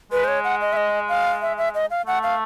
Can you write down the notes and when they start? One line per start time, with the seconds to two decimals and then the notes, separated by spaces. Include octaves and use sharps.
0.12 G#3 B4
0.24 C5
0.28 C#5
0.44 F#5
0.61 D#5
0.73 E5
0.77 D#5
1.09 F5
1.42 E5
1.58 E5
1.74 D#5
1.91 F5
2.06 A3 F#5
2.23 F5